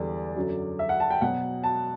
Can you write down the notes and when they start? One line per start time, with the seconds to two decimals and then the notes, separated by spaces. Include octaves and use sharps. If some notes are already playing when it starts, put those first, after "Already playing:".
Already playing: E2 D3 G3 D5
0.36 F#2 D3 F#3
0.79 E5
0.89 F#5
1.00 A5
1.10 G5
1.21 B2 F#3 F#5
1.64 A5